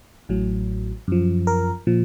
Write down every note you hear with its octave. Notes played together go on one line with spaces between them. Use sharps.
A1 A2 F#3
F#2 F3
A#4
A#2 F3